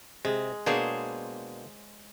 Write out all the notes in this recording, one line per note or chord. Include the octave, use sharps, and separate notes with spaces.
C3 G#3
B2 A#3 D4 G#4 C5 C#5